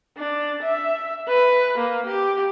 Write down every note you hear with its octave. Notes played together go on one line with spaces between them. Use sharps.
D4
E5
B4
A#3
G4